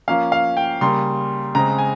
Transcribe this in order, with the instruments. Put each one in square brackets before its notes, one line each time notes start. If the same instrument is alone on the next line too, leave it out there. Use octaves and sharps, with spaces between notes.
[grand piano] F3 A#3 C#4 F5
F5
G5
C#3 G3 A#3 C6
C#3 G#3 C4 A#5
G#5